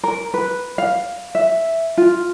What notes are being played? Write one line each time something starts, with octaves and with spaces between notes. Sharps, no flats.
A#4
B4
F5
E5
F4